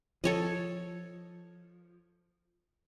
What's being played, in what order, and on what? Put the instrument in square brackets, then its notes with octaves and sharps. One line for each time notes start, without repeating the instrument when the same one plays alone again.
[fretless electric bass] F3 [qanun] A4 C#5 D#5